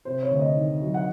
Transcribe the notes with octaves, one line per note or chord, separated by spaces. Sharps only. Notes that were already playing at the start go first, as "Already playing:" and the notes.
C3 C5
C#5
D2
D#5
D#3
F#3
F#5